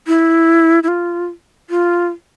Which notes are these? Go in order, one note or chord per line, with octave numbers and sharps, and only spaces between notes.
E4
E4
F4
F4